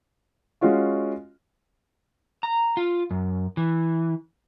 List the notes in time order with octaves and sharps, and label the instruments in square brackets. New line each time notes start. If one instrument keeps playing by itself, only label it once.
[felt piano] G#3 C#4 F4 F#4
[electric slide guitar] A#5
F4
F#2
E3